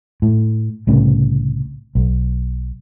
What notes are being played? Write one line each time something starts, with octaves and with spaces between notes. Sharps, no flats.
A2
C2 A2 C#3
B1